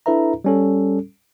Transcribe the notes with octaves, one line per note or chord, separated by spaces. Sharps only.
D4 E4 A4 B4 E5 A#5
G3 C#4 A4